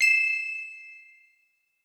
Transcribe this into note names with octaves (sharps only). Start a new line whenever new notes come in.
C7 E7